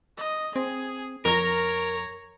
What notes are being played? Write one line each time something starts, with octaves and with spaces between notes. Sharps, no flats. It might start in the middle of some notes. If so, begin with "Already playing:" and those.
D#5
C4 G#4
F2 A#4 C#5 A#5